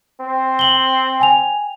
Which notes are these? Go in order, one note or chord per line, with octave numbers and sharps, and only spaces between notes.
C4
G5 F#7 G7
G5 G#5 F7